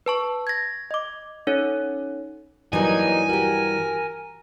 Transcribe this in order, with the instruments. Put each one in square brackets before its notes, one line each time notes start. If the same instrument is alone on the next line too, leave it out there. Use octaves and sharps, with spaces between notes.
[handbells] B4 A5 C#6
G#6 A#6
D#5 D6
C#4 D#4 A4 C#5
[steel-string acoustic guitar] G2 E3 [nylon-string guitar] F#3 G3 A#3 [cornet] D#4 [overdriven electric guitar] G#5
[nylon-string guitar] F#4 G4 [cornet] A#4